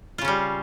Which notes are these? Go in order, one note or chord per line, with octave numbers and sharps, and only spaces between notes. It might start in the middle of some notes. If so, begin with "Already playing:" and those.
C#3 G3 C#4 F4